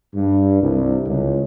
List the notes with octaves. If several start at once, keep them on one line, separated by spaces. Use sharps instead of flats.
G2
C2
C#2